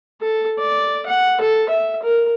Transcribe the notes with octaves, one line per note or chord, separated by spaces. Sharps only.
A4
D5
F#5
A4
E5
A#4